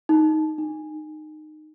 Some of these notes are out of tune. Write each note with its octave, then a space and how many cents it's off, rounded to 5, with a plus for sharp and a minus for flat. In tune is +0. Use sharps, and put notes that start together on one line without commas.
D#4 +5
D#4 -20